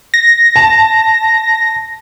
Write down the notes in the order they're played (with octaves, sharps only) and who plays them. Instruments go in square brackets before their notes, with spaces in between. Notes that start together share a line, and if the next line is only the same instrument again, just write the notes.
[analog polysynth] A#6
[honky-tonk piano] A5